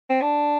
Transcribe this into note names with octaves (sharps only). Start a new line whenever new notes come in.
C4
D4